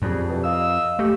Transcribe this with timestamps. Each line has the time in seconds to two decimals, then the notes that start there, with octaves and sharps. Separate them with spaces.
0.02 F2 G3 G#4
0.29 E2 G2 B2
0.44 D#5 F5 E6
0.99 A3 G4